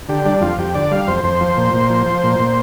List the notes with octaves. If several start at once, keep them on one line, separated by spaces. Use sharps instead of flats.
D3 G4
G3 D4
F2 F4
F2 G4
D3 D5
G3 F5
F2 C5
F2 C5
F3
A#2
A#2
F3
F3
A#2
A#2